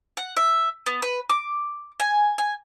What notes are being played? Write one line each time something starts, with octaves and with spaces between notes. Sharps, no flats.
F#5
E5
B3
B4
D6
G#5
G#5